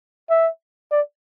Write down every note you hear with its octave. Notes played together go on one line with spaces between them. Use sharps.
E5
D5